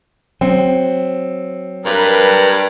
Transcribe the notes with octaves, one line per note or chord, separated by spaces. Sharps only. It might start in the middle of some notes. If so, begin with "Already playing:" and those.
F#3 C4
G2 A#4 B4